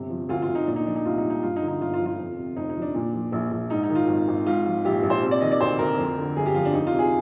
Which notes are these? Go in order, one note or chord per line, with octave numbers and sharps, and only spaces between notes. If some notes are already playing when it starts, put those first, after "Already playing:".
Already playing: G1 C3
F3
D2 F4
F4
D2
D#4
A#2 D4
D#4
F3 D4
D#4
C2 F4
D#4
C2
D#4
G2 F4
D#4
D3
D#4
G1 F4
F4
F3
F4
F2
C3
F1 D#4
D#4
F3
D4
A#2
F3
A#1
A#1
G#2 D#4
D#4
D#3
F4
G#1
G#1
G#2 F4
F3 F4
A#1 G4
A#1
C5
C3
D5
D#3 D#5
D5
D2 C5
D2 A#4
F2
D3
G1 G#4
G4
F3 F4
D4
F2 D#4
F4
C3
G#4